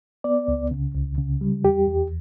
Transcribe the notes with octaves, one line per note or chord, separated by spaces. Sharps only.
B3 D5
C#2
C#3
C#2
C#3
G3
E2 G4
E2